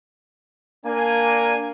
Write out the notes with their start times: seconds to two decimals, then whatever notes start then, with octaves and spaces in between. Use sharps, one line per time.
0.85 A#3 D4 A#4 G#5